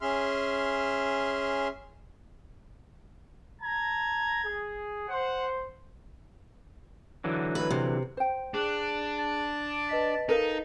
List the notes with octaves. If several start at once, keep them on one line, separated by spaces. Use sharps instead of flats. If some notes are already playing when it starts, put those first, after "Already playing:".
C#4 G#4 E5 C6 F6
A5 A#5 G#6
G#4
C5 F#5
D3 E3 F#3
B4
C3
C5 G5
D4 G#4 F#6
A5
B4 D#5 B6
D#4 A4 A#4 F5